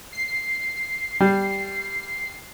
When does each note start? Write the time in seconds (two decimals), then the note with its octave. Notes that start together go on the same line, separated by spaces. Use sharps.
0.12 C7
1.20 G3